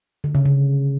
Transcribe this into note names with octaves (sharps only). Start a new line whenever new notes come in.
D3
C#3
C#3